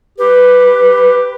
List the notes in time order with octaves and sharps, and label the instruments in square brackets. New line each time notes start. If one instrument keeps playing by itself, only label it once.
[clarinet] G4 [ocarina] B4